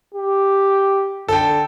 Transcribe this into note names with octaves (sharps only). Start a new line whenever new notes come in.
G4
D3 A4 G5